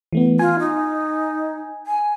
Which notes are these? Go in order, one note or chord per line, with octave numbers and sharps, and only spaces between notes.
E3 A3 B3
F4 G#5
D#4
G#5